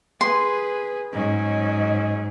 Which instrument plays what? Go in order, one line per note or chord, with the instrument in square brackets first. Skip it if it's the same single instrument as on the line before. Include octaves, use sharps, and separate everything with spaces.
[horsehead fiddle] G#4 B4 [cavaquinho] C6
[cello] G#2 [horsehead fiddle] F#3 C#4 [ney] D#5